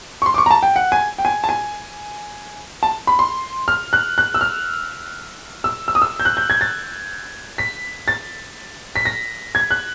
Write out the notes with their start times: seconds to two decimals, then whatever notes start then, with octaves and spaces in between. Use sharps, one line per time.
0.22 C#6
0.26 C6
0.34 D6
0.38 C#6
0.46 A#5
0.51 A5
0.63 G5
0.76 F#5
0.92 G#5
1.18 G5
1.25 G#5
1.44 A5
1.49 G#5
2.83 A5
3.07 B5
3.19 C6
3.68 F6
3.93 F#6
4.18 F#6
4.35 E6
4.41 F6
5.64 E6
5.88 E6
5.95 D#6
6.02 E6
6.20 G6
6.25 F#6
6.37 G6
6.50 G#6
6.61 A6
7.58 B6
8.08 A6
8.96 B6
9.05 A#6
9.55 G#6
9.71 F#6